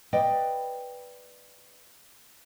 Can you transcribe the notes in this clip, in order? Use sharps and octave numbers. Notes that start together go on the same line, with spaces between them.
B4 D5 D#5 G5